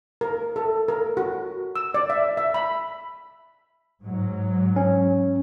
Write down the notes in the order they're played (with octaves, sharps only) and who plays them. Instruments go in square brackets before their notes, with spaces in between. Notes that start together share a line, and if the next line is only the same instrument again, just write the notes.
[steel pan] A#4
A4
A#4
F#4
E6
D5
E5
E5
B5
[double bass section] G#2 F#3
[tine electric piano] C#4